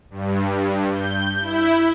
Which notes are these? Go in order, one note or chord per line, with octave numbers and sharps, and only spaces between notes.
G2
G6
E4